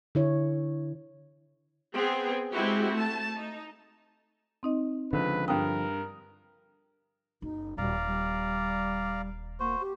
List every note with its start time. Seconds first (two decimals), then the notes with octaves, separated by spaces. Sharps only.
0.15 D3 E4 C#5
1.94 B3 C4 G#4
2.52 G#3 C4 E4 F#4 G4
2.91 A3 A5
3.37 D#4
4.63 C4 D#4 D#5
5.13 C#2 D3 F3 B4
5.48 G2 A#4 G5 D#6
7.42 F#1 D#4
7.78 D#1 G3 D5 F5 A#5
8.07 G3
9.60 A#3 F#4 C5
9.81 G4